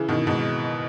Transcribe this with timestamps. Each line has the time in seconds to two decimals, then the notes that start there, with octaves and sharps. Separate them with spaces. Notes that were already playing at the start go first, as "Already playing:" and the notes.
Already playing: C#3 E3
0.08 B2 D#3
0.27 G#2 B2